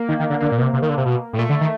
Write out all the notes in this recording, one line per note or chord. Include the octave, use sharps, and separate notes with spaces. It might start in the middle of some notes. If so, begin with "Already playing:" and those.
Already playing: A#3
D#3
D#3
D3
D3 A#3
A#2
B2
C3
C3
D#3
D3
C3
B2
A2
A#2 A3
D3
D#3